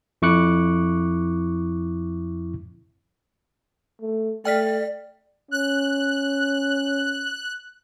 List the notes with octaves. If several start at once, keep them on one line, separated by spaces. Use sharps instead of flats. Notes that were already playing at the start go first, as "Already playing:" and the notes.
F2 E4 C#6 D6 F#6 C#7
A3
A3 D5 G5 F6 B6
C#4 F#6